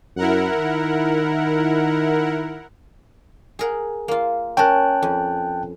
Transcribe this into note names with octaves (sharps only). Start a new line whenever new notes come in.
F#2 E4 A#4 F#5
D#3
G#4 A#4 F#5
A#3 F4
C#4 A#4 G5 A5 F#6
F2